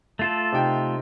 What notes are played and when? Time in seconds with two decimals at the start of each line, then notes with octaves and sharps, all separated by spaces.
0.19 A3 F4 A4
0.52 C3 D#4 G5